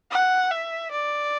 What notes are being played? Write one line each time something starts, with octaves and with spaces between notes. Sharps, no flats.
F#5
E5
D5